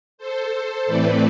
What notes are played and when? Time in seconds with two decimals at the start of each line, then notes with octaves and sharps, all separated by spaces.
0.18 A4 C5
0.86 A2 E3 A3 C4 B4 D5